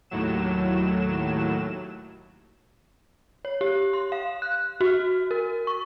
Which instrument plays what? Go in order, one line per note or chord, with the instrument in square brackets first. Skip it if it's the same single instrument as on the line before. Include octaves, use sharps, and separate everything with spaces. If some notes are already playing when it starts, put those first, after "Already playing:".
[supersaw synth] D#2 A2 F#3 E7
[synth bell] C#5
G4
C6
F5
F#6
F#4
A#4
C#6